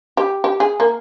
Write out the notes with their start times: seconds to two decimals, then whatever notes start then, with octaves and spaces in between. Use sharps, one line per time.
0.17 G4
0.44 G4
0.60 G#4
0.80 A#3